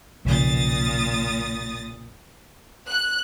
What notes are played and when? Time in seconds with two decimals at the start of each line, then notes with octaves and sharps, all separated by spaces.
0.25 B1 F2 A#2 C#3 D#6 A6
2.89 F#6